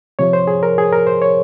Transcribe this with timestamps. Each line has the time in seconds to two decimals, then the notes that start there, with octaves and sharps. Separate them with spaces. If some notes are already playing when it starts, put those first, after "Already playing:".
0.19 C3 F3 C#5
0.33 C5
0.48 G#4
0.63 A#4
0.78 G#4
0.92 A#4
1.07 C5
1.22 C#5